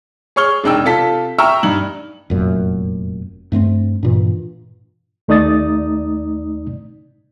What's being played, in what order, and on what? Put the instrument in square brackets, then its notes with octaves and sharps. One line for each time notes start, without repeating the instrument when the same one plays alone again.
[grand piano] G#4 C#5 C#6 F6 G7
E1 C3 D4 D#4 G5 E6
C3 F4 A4 B6
E5 G5 A#5 C#6 E6 F6
G2 D#4 F#7
[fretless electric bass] F1 F#2 A#2
G2 A3 A#3 C4
G2 A#2 E3
[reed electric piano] D#2 A3 D#4 D5 D#6 A6